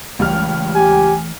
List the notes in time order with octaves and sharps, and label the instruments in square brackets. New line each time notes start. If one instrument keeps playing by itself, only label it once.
[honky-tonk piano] C#2 G3 F6 [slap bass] E3 A3
[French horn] G4 [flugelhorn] G#5